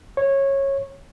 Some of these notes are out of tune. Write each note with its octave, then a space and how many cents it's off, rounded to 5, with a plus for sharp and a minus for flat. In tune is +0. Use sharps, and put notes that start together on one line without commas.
C#5 -15